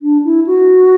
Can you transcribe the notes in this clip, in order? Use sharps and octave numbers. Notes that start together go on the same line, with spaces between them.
D4
E4
F#4